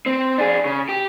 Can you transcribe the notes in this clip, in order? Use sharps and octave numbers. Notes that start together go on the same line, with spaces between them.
C4
D4 G#4
C#3
G4